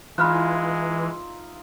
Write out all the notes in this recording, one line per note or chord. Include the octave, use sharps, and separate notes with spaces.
E3 G#3 D#4 F4 E5 B5 F6 F#6